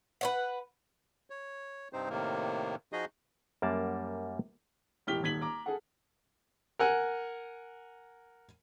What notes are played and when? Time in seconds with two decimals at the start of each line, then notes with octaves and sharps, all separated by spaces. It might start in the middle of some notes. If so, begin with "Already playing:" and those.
0.21 B4 C#5 F#5
1.30 C#5
1.93 G2 C3 C4 D#4 C5
2.09 A2 C3 D#3 A#3
2.93 F3 D#4 F#4 G#4 D#5
3.62 F#2 G3 A#3 D5 A5
5.07 E1 A2 G4 F6 B6 G7
5.22 D#1 G#1 G#6 B6 F#7
5.41 A#5 D6
5.66 G#4 A4 F#5
6.79 A#4 F#5 G#5